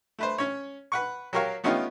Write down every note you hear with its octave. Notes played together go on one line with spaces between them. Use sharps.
A3 B4 C5
C#4 C#5
B4 F#5 C#6
F#3 G4 A#4 C#5 F5
A3 B3 C#4 D#4 F4 G4